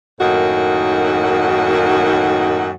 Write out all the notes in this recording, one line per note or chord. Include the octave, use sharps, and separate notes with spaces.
F#2 A2 D#3 A#3 D#4 F#4